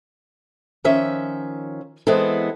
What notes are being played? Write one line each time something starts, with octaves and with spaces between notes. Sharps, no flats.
D#3 F3 C#4 E5
E3 G#3 B3 C4 E4 A4